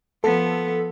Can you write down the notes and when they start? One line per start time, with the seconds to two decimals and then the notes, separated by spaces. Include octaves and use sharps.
0.24 F3 B3 A4